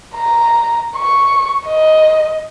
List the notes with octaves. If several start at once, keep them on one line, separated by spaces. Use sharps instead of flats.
A#5
C#6
D#5